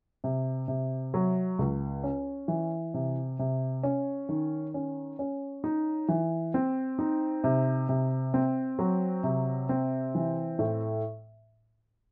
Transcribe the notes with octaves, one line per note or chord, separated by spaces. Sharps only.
C3
C3
F#3
C#2
C#4
E3
C3
C3
C#4
D#3
C#4
C#4
D#4
E3
C4
D#4
C3
C3
C4
F#3
C3
C4
E3
A2